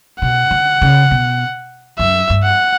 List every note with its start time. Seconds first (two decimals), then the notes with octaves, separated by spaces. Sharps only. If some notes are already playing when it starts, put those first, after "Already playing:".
0.22 B2 F#5
0.51 D3
0.82 C#3
1.11 B2
1.99 F#2 E5
2.30 G2
2.44 F#5